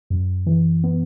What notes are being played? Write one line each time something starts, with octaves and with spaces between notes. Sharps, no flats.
F#2
E3
B3